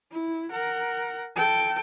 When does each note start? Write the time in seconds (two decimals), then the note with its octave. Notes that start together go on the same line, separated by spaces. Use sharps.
0.12 E4
0.51 A#4 F#5
1.36 A4 G5